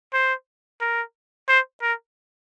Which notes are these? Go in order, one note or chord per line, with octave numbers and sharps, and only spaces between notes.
C5
A#4
C5
A#4